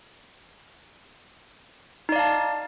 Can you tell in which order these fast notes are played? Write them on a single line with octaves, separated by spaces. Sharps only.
D#4 D5 F5 A5